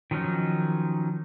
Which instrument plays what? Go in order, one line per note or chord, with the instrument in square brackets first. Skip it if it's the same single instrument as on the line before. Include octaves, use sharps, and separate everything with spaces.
[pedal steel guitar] D#3 F3 F#3 C#4 D#4